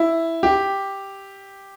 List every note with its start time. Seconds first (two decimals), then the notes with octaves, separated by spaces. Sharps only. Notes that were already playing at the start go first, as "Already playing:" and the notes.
Already playing: E4
0.43 G4